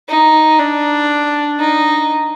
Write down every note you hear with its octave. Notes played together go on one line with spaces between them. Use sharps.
D#4
D4
D#4